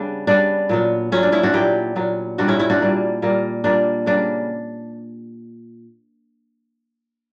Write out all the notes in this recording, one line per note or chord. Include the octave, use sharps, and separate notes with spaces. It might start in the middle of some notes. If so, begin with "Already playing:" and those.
Already playing: C#3 G3 B3 D4
C#3 G3 B3 D4
A#2 F#3 B3
A#2 F#3 B3 C#4
D4
C#4 E4
D4 F#4
A#2 F#3 B3 E4 G4
A#2 F#3 B3
A#2 G3 A#3 D4 F#4
C#4 E4
C#4 E4
D4 F#4
A#2 G3 A#3
A#2 G3 A#3
A#2 G3 A#3 D4
C#3 G3 A#3 D4